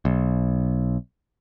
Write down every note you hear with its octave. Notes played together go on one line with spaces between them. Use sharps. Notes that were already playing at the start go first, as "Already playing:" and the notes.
B1